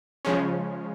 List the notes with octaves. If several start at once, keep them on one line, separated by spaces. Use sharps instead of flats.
C#3 F3 G#3 C#4